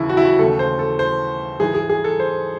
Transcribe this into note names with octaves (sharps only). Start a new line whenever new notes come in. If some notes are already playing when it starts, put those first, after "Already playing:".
Already playing: D#2 C#3 E3 E4
F#4
E4
F#4
D#2 C#3 E3 A3 A4
C5
A4
C5
G#2 E3 G#3 G#4
G#4
G#4
A4
C5